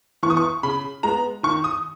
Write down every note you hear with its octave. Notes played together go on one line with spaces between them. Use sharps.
E3 B3 C#6 D#6
C#6
C#3 B5
G#3 B3 A#5
D#3 C#6
D#6